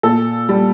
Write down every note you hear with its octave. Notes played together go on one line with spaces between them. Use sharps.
A#2 A4
G3